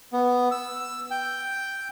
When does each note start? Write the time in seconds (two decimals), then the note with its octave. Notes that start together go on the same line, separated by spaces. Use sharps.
0.13 B3
0.51 E6
1.11 G5